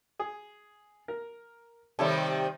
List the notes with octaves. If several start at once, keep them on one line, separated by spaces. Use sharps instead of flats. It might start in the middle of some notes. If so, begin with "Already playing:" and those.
G#4
A#4
C3 D#3 G3 A4 C#5 E5